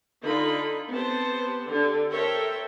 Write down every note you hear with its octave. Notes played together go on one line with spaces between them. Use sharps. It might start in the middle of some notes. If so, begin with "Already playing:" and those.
D3 D#4 F4 B5
B3 C4 G4 C5 A5
D3 G4
A4 A#4 C5 C#5 E5 G5